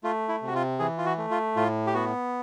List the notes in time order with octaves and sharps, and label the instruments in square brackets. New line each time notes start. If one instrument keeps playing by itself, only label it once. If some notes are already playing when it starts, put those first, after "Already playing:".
[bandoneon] A3 F4
E4
C3
F#4
F4
E3 G#4
F4
F#4
A3
F4
A2 F4
G4
B3 F#4